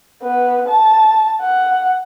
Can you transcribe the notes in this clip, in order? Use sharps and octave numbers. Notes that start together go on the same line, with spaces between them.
B3
A5
F#5